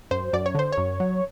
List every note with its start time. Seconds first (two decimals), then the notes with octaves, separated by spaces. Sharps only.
0.11 F#2 C5
0.33 F#2 D5
0.46 C#5
0.55 D3 C5
0.72 C#5
0.77 F#2
1.00 F#3